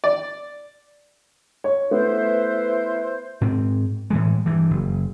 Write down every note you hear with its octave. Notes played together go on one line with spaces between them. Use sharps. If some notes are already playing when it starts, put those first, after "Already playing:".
D5
C#5
A3 B3 E4 B4 C5
G#2 C4
A2 E3 G#3
G2 E3
F#1